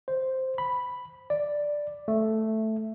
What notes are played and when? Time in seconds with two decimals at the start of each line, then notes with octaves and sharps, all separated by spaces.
0.08 C5
0.58 B5
1.30 D5
2.08 A3